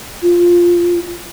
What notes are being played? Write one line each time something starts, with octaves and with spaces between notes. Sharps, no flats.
F4